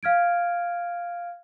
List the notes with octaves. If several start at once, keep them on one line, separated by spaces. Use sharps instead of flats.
F5 F6 G#6 D7